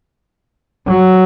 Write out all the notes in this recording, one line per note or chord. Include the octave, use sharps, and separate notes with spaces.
F#3